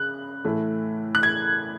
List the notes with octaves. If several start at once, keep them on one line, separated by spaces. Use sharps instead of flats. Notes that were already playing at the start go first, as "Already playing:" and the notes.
Already playing: C#3 F#6
A2 E3 A3
F#6
G#6